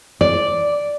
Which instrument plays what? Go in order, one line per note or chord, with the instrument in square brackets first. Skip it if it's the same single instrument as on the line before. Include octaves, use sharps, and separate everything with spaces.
[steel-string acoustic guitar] D5